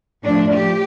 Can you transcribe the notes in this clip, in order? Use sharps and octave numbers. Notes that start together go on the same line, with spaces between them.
A2 F3 D4
G4